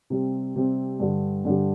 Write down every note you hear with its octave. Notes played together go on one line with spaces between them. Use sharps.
C3 G3 C4
C3 G3 C4
G2 D3 G3
G2 D3 G3